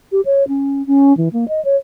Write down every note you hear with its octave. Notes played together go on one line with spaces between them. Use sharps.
G4
C#5
C#4
C#4
E3
A#3
D#5
C#5